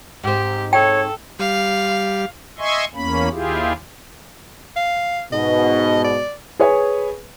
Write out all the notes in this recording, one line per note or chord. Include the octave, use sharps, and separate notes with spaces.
G#2 C4 G4
A4 C#5 G5
G3 F5
D#5 E5 G#5 C6 C#6
E2 A#3 C#4 B5
D#2 E4 F4 G4 G#4
F5
G#2 B2 D#5
D5
G#4 B4 C#5 G#5